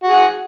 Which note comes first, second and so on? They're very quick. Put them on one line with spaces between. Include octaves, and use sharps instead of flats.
F#4 G#4 F#5